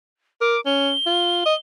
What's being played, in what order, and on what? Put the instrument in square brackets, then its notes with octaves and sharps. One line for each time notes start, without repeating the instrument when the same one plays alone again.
[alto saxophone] A#4 [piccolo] D6
[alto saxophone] C#4 [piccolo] G7
[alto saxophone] F4
D#5